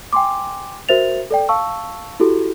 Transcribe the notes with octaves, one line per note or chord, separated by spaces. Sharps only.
G5 G#5 C6 D6
F#4 A#4 C5 E5 A6 F7
A4 D5 G5
F5 A5 C#6 E6
E4 F#4 G4 A4